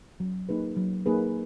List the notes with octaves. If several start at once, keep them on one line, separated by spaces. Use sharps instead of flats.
F#3
A#3 D#4 G#4 B4
F#3
A#3 D#4 G#4 B4